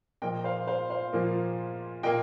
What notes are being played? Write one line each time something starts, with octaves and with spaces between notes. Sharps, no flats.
A#2 F3 A#3 D#5 G5
C5 F5
C5 F5
C5 F5
A#2 F3 A#3
A#2 A#3 D#5 G5